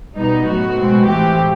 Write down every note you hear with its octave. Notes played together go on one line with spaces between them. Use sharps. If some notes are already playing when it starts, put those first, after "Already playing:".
B2 G3 B3 D#4
A2 F#3 B3 F#4
B2 G#3 C4
A2 E3 A3 C4 G4